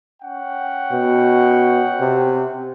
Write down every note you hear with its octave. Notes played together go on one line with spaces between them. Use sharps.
C#4 F#5 G5
B2
C3